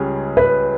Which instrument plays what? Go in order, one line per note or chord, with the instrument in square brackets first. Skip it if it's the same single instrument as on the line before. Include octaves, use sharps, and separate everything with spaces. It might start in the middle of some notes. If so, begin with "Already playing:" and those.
Already playing: [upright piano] C#2 C#3 G3 C#4 G#4
[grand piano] B4